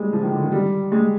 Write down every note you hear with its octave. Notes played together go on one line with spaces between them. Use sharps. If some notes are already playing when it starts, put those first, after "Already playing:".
Already playing: G3 G#3
F3
D#3
D3
D#3
G3
G#3